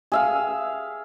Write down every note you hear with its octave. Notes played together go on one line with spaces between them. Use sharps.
G#4 E5 F5